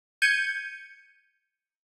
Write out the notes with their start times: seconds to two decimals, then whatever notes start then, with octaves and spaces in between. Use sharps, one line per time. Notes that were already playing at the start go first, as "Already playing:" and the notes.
0.22 G6 G#6 C#7 D#7